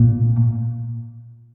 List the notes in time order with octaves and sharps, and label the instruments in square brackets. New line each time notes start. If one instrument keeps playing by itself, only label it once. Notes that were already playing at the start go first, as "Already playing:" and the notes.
Already playing: [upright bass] A#2